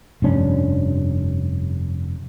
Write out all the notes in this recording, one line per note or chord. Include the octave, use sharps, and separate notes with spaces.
F1 G2 C#4 D4